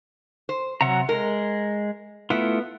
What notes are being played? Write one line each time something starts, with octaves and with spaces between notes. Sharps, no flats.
C5
C3 F#3 F#5 A#5
G#3 A#4
A3 B3 E4 F4